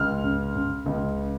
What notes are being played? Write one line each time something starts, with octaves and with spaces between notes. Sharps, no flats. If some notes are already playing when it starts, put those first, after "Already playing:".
Already playing: C#2 F6
C#3
C#3
C#2